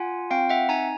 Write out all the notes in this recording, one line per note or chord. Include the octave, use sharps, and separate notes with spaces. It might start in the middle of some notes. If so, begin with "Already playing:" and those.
Already playing: F4 F#5 G#5
C4 F5 G5
E5 F#5
D#4 G#5 A#5